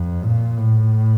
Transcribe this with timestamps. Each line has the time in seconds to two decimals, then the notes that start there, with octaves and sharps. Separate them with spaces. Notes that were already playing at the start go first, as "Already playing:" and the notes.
Already playing: F2
0.24 A#2
0.58 A2